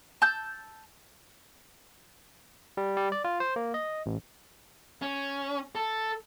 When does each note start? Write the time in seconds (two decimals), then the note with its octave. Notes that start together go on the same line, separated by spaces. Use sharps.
0.22 A5 E6 G6
2.77 G3
2.97 G3
3.12 D5
3.24 F4
3.40 C5
3.56 A#3
3.74 D#5
4.06 A1
5.02 C#4
5.75 A4